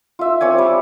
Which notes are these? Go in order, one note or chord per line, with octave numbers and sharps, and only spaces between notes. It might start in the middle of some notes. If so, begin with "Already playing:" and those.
F4 E5
C4 C#5 D5 G#5
G3